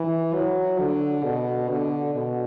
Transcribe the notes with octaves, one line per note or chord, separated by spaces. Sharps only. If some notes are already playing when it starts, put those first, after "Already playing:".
Already playing: E3
F#3
D3
B2
D3
B2